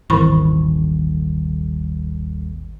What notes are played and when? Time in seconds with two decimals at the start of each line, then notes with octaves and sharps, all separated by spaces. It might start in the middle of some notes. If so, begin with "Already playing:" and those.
0.10 D#1 G#1 E3 E4 A#4 B5 C#6